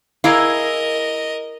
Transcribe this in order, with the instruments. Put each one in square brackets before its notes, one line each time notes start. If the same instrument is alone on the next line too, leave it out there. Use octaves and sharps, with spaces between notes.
[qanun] E4 G#4 D6 [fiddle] A#4 D#5 [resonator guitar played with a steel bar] F5 A#5